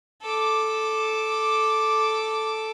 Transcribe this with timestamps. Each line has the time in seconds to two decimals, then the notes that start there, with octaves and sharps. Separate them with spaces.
0.22 A4 D6